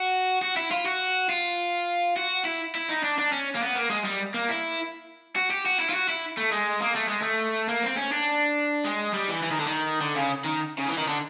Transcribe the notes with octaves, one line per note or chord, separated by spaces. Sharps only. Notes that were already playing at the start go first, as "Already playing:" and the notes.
Already playing: F#4
F#4
E4
F4
F#4
F4
F#4
E4
E4
D#4
D4
D4
C#4
A#3
B3
A#3
G#3
G3
A#3
E4
F#4
G4
F#4
E4
F4
F#4
E4
A3
G#3
A#3
A3
G#3
A3
A#3
C4
C#4
D4
G#3
G3
E3
E3
D#3
D3
D#3
D3
C#3
D#3
C#3
E3
D#3
D3